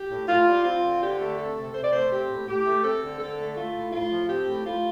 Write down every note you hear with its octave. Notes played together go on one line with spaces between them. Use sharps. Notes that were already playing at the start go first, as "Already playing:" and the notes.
Already playing: G4
A2
A2 F4
G3
C4 F4
D3
D3 G4
A3
C4 A4
C3
C3 C5
D5
A3 C5
C4 G4
A2
A2 G4
A3
C4 A4
D3
D3 A4
A3
A3 F4
A2
A2 F4
F3
C4 G4
A2
A2 F4